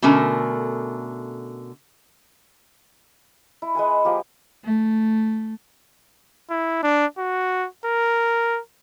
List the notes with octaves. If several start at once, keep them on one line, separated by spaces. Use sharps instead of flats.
B2 D3 A3 C#4 A#4
E4
G#3 B4 F#5 G#5
F3 A#3 G4
A3
E4
D4
F#4
A#4